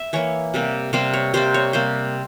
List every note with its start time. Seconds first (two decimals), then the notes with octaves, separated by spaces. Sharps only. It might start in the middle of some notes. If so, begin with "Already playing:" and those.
Already playing: E5
0.13 E3 A#3 C#5
0.54 C3 G3 A#3
0.93 C3 G3 A#3 C5
1.14 C#5
1.34 C3 G3 A#3 C5
1.54 C#5
1.73 C3 G3 A#3 C5